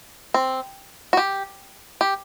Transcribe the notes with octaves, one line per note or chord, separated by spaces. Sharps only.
C4
F#4
G4
G4